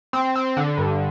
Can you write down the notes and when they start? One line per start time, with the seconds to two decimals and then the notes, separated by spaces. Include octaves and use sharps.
0.13 C4
0.36 C4
0.57 D3
0.77 G2